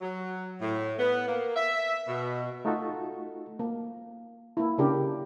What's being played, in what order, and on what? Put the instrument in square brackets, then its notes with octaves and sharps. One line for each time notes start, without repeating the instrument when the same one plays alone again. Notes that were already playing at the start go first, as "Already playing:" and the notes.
[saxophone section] F#3
A2
B3
A#3
E5
B2
[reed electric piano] A3 D#4 F4 F#4 A4
[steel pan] A#3
A#3 E4
C#3 D4 G4 A#4